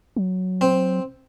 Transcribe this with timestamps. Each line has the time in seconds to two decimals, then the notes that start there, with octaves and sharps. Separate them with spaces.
0.16 F#3
0.61 C4